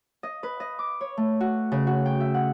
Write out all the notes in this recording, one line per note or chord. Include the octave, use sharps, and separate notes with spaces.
D#5
B4
D#5
D6
C#5
A3
F#4
C#3
F#4
G5
E5
F#5